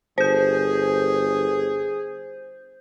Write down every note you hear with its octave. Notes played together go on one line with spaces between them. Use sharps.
G1 G#4 C5 G6